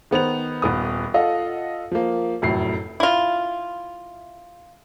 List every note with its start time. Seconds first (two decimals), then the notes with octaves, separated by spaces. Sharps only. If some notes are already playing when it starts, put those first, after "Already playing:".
0.11 D#3 B3 C5 F7
0.62 D#1 B3 D#6
1.14 F4 A4 D#5 F5 F#5
1.91 F3 A#3
2.42 F1 F#2 A2 C7
3.00 E4 F4